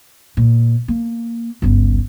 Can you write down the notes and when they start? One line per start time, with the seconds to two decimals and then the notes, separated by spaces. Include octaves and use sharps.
0.37 A#2
0.88 A#3
1.62 G1 C#2